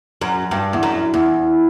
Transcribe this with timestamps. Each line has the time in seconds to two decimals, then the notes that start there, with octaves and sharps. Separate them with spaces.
0.21 F#2
0.51 G2
0.73 E2
0.83 F#2
1.14 E2